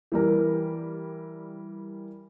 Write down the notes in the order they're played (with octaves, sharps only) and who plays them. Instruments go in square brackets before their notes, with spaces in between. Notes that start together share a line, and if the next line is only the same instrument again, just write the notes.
[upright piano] E3 G3 A#4